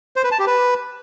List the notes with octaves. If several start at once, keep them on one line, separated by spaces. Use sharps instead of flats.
C5
B4
A5
G4
B4